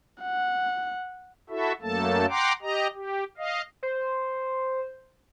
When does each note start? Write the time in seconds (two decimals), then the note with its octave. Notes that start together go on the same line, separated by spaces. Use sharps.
0.22 F#5
1.50 E4 F#4 A4 E5
1.82 F#2 F#3 A3 A#3 A4 A5
2.29 F#5 G5 A#5 C6 D6
2.62 G4 D#5 A#5
2.94 G4
3.37 D#5 F5
3.83 C5